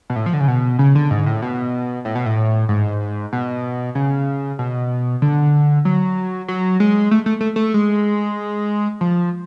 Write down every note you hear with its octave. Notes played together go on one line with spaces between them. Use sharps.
B2
A2
F3
D3
C#3
B2
C#3
D3
G#2
A2
B2
A2
B2
A2
G#2
B2
C#3
B2
D3
F#3
F#3
G#3
A3
A3
A3
A3
G#3
F3